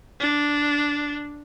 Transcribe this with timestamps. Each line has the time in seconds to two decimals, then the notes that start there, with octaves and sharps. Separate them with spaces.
0.20 D4